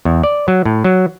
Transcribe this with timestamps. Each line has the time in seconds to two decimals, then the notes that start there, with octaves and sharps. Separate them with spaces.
0.05 E2
0.23 D5
0.48 F#3
0.65 A2
0.84 F#3